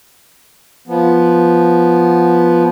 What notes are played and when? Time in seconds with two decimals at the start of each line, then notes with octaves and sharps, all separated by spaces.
0.88 F3 B3